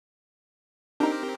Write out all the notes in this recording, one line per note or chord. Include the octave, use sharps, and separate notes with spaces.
C4 D4 D#4 G4 A#4